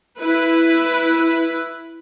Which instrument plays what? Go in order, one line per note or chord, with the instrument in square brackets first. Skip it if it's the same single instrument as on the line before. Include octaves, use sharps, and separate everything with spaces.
[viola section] E4 B4